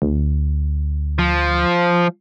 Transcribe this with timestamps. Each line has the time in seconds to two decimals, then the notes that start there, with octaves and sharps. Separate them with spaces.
0.02 D2
1.19 F3